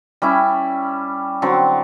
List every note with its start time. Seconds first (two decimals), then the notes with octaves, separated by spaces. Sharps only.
0.22 G3 C#4 E4
1.42 D3 F#3 C4